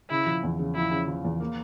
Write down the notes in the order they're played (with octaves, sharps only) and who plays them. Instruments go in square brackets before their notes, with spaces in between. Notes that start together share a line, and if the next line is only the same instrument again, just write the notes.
[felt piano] C#3 [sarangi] E4
[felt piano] F3
E2
C#3
[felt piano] F3 [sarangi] E4
[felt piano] C#3
F3
E2
A#3